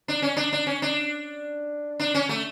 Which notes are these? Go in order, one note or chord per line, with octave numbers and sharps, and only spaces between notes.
D4
C#4
D4
D4
C#4
D4
D4
C#4
A3